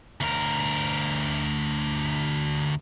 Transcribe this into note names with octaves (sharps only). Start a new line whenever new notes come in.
D2 A#4